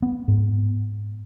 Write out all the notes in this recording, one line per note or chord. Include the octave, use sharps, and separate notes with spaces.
B3
G#2